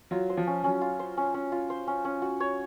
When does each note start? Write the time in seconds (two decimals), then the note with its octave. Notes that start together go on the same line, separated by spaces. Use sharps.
0.11 F#3 F4
0.30 C5
0.37 F3
0.47 C#4
0.63 F#3 C#4
0.81 F4
0.99 C5
1.17 C#4
1.34 C#4
1.52 F4
1.70 C5
1.87 C#4
2.05 C#4
2.22 F#4
2.40 C#5